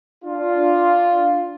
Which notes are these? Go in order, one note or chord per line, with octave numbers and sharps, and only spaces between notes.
D4 F4